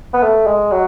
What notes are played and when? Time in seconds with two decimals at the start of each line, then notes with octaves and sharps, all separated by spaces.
0.14 B3
0.22 A3
0.47 G#3
0.72 F#3